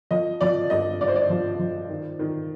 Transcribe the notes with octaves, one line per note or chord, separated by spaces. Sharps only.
F3 D#5
F3 D5
G2 D#5
G2 D5
C5
D5
F3
F3
D#3
D#3